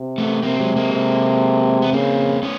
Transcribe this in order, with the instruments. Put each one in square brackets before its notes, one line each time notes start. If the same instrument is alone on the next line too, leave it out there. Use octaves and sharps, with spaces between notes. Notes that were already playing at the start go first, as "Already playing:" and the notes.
Already playing: [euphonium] C3
[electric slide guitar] A3 B3
[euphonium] C3 [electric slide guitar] A#3 C4
[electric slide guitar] F#3 G#3
G#3 A#3
[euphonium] C3
[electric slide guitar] B3
[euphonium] C#3 [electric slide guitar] A#3 C4
[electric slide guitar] B3 C#4